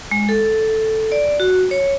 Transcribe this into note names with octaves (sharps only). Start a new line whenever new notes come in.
G#3
A4
D5
F#4
C#5